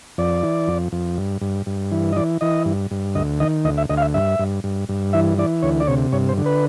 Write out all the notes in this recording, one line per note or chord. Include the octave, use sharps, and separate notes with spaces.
F2 D5
E3
F2
F2
G2
G2
G2
E3
D#5
E3 D5
E3 D#5
G2
G2
D2 D#5
D#3 D#5
D2 D#5
E5
D2 D#5
F5
E5
G2 E5
G2
G2
G2
E3 E5
E3 D5
D2 C#5
D5
C3 C#5
G2 C#5
C5
D3
B4